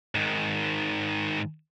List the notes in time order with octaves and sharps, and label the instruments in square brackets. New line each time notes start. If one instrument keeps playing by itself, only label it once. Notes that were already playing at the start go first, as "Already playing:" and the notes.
[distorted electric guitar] G#2 D#3